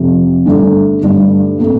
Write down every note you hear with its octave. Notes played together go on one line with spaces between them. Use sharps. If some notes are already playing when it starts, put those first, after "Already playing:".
Already playing: F2 C3 F3
G2 D3 A3 D4
G2 D3 A3 D4
A#2 A3 C4